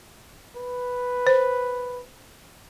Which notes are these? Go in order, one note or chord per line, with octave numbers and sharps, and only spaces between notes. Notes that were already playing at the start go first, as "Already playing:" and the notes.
B4
C5